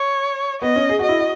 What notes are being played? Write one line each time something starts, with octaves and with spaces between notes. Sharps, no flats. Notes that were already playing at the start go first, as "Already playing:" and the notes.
Already playing: C#5
B3 D#5
C#4
G#4
F#4 D#5
E4
F#4